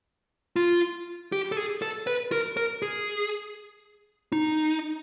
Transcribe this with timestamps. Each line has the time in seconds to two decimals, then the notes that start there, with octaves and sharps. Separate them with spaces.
0.56 F4
1.32 G4
1.52 A4
1.57 G#4
1.82 A4
2.07 B4
2.32 A#4
2.57 A#4
2.82 G#4
4.32 D#4